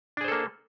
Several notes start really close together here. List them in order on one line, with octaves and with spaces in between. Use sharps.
D4 G#4 C5 A4 A#3